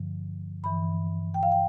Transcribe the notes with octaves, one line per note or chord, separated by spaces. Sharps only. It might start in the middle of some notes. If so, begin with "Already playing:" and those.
Already playing: G2 D3 F3
G2 E3 B5
G5
F5
G5